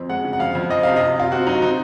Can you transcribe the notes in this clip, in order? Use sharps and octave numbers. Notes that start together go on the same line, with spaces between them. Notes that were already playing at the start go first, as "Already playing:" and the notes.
Already playing: F2 C4
G#3 F#5
C#3
F#5
F2 F5
F2
F3 D#5
C3 F5
C3 D#5
C3 F4
C4 F#4
F#3 D#4
C4 D#4